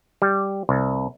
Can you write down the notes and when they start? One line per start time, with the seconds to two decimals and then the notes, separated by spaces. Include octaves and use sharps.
0.22 G3
0.69 C2